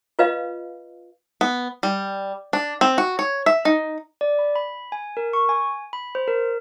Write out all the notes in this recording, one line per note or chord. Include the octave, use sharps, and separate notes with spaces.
F4 B4 D#5 F5
B3
G3
D4
C4
F#4
C#5
E5
D#4
D5
B5
B5
G#5
A#4
C#6
G#5
B5
C5
A#4